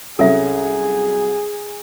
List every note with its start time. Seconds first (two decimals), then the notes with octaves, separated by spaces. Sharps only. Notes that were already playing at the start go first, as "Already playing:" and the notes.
0.19 C2 F#3 C#4 G#4 A4 E5